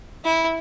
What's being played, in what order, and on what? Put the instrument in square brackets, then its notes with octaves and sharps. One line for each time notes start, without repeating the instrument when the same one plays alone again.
[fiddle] E4